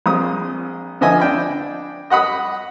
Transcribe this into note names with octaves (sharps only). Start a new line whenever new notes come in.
A#1 C4 D#6
D3 F3 D#5 E5 G#5
D4 G5 B5
D#5 F#5 B5 D#6